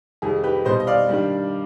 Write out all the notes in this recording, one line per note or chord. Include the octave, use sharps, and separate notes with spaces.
F2 C3 D#3 G3 G#4
G4 B4
B2 G3 C5 D#5
D#5
D5 F5
G2 D#3 G3